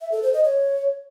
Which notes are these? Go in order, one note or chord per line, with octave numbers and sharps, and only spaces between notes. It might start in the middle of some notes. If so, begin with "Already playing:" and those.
E5
A4
C5
D#5
C#5